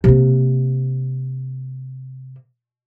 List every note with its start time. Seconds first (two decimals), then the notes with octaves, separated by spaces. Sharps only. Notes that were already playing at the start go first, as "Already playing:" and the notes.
0.04 C3 A#3